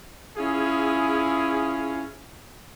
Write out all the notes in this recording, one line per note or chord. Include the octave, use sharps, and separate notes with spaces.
C#4 E4 F4 G#4